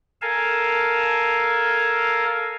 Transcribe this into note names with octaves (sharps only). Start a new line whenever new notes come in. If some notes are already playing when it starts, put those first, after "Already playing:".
A4 A#4 F5 G#5 A5